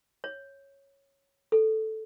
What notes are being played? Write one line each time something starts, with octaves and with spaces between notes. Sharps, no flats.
C#5
A4